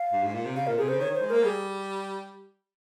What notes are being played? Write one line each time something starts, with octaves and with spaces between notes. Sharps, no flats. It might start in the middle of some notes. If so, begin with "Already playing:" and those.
Already playing: F5
G2
G#2
A#2
C3
C#3 F5
A#2 A#4
C3 G#4
C#3 C5
D#3 C#5
D#3 C5
G#3
A#3 A#4
G3 G#4